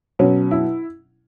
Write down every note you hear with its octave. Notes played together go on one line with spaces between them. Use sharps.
B2 F#3 C#4
E4